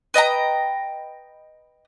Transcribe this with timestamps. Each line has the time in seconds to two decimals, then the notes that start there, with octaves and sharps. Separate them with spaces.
0.14 B4 D#5 G5 A#5